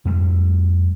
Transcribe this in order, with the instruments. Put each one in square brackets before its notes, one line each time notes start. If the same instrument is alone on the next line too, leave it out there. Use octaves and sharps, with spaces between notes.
[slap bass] F2 G3 A3